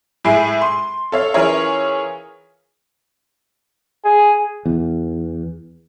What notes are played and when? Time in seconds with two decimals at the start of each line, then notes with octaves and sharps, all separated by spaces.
0.24 A2 G#3 E4 G#5 C7 D7
0.61 C6
1.12 A4 C#5 F5
1.34 E3 C#4 F4 G#4 A#4 C#5
4.04 G#4
4.66 E2